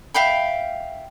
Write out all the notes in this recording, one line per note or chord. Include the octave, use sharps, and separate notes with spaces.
E5 F5 G5 B5